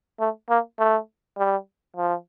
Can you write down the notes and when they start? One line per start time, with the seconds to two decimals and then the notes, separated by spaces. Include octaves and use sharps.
0.20 A3
0.50 A#3
0.79 A3
1.38 G3
1.97 F3